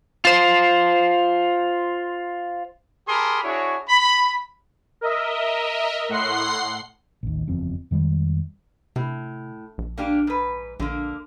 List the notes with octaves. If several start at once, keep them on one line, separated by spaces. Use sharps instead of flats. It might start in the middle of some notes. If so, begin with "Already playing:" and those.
F4 C5
G4 G#4 A#4 A5 B5 C6
D4 E4 F#4 G#4 C#5
B5
A#4 D#5 E5
A2 F#5 C6 C7
A1 D#2
F#1 E2 F3 C4
F2 D#3 G3 G#3
A2 C3
A#1
A#3 D4 G4
G#2 B4
A#1 D3 A#3